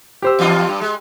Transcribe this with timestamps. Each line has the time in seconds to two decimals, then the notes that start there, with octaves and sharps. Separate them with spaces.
0.22 G4 C5 E6
0.39 E2 G2 F4
0.69 G2
0.81 G#3